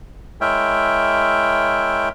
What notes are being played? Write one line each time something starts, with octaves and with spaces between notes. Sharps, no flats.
G#3 E4 A#4 C#5 E5 G5